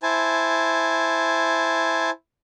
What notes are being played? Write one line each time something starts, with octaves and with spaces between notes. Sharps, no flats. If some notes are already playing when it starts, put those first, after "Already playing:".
E4 C5 G#5 A5